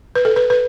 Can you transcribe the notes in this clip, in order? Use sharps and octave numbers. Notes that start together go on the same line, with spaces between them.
B4
A4
B4
B4